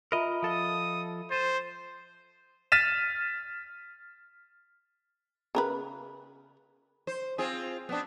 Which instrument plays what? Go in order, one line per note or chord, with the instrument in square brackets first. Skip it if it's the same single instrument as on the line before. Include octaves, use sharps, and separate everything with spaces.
[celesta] F4 E5 B5 [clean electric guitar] A#4 D#5
[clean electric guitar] F3 A4 D#5 [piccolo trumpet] D#6
[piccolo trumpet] C5 [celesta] A6 D#7 E7
[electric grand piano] F6 A6 B6 D#7 E7
[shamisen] C#3 A#4 B4
[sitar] C5
C4 F4 G#4
B3 C4 D4